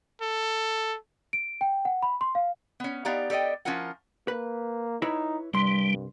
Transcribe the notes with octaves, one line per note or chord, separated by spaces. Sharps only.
A4
D7
G5
F#5
B5
C6
F5
B3 C#4
B3 D#4 G4 D5 F5 A#5
G4 A4 D5 D#5 G5
F3 C#4 E4 F4 A#4 F#5
A#3 B4
D#4 E4 B4 C#5
C2 G2 G3 C6